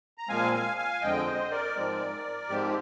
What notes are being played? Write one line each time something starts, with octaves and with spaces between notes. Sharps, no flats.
A#5
A#2 F3 G#3 C4 F5 G#5
F5 G#5
F5 G#5
F2 D3 G#3 C4 D#5 G5
C5 D#5
A#4 D5
G#2 F3 G#3 C4
G#2 F3 G#3 C4 G4